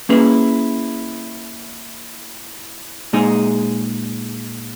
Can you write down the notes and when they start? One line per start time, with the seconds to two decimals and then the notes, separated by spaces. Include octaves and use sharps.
0.09 A#3 C#4 E4 G#4 B4
3.13 A#2 G#3 D#4 G#4